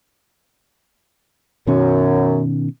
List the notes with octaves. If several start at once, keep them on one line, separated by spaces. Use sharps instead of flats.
F#2 B2 D#3 C#4